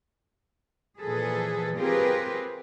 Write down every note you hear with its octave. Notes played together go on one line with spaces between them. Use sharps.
A#2 E3 F3 G#4 A4 B4
C4 F4 G4 G#4 A#4 B4